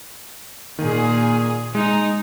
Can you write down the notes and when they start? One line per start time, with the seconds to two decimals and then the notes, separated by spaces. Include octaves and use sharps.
0.79 A#2 D#3 G#4
1.75 G#3 D#4